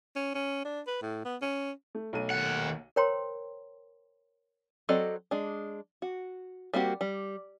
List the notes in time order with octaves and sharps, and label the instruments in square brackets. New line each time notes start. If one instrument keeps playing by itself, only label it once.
[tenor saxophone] C#4
C#4
D4
B4
A2
B3
C#4
[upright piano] A3
B1 A3 D#7
[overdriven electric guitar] D#2 F#5
[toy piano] A#4 C5 C#5 G5 A#5 C6
[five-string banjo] F#3 C4 A4 D5 D#5
G#3 D4
F#4
G3 A#3 C4 F#4 G4
G3